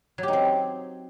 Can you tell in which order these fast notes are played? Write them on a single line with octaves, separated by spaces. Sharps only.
F#3 G4 D#4 C4